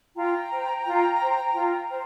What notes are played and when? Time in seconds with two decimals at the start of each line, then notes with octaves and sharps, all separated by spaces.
0.16 F4 G5 A#5
0.52 C5
0.86 F4
1.21 C5
1.55 F4
1.90 C5